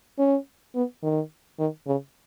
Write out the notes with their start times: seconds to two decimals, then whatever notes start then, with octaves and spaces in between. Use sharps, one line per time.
0.19 C#4
0.75 B3
1.03 D#3
1.59 D#3
1.87 C#3